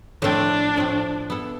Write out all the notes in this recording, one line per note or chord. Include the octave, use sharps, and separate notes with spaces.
A2 F3 A3 C4 D4
A2 F3 A3 C4
B3 E4 A4